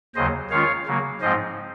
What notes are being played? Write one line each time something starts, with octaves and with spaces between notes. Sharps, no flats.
D#2 C#3 F#3 C5 D#5
D#3 G#3 C#4 F4 C#5 F5
C#3 F#3 A#3
G#2 F3 G#3 C4 D#4 C5 D#5